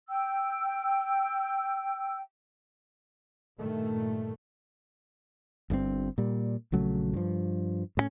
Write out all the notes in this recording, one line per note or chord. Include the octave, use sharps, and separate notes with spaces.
G5 E6
G2 A#2 D#3 A3
G1 G2 C3 C4
A#2 G3
A#1 C#3 F#3 A3
G2 F3
A2 F#3 C#4